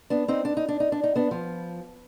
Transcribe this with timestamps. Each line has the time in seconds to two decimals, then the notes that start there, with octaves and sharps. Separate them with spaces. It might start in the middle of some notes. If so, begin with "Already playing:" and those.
0.10 B3 D4
0.28 C4 D#4
0.45 D4
0.57 D#4
0.68 D4
0.80 D#4
0.92 D4
1.04 D#4
1.16 B3 D4
1.31 F3